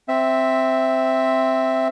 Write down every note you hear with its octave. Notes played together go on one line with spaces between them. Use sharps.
C4 E5